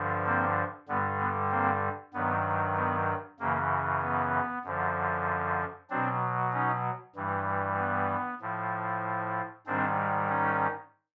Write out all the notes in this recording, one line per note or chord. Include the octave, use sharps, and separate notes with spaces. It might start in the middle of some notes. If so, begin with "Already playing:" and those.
Already playing: G2 D3 F3
A#3 C4
G2 D3 G3 B3
B3
A#3 C4
G2 D#3 F#3 B3
B3
F#2 C#3 E3 A#3
B3
F#2 D3 F3
B2 F#3 C4 D4
C#4 D#4
G2 E3 G3
B3
A2 F3
G#2 D#3 G3 C4 D4
C#4 D#4